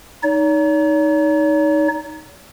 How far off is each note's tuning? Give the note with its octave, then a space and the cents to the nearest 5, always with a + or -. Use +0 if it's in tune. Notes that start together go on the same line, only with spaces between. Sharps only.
D#4 +0 C#5 +45